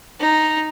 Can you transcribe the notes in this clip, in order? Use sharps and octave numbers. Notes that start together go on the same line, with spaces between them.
D#4